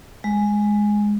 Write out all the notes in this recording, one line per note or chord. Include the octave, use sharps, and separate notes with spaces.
G#3